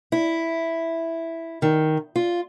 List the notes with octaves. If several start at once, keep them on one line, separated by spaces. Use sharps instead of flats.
E4
D#3
F4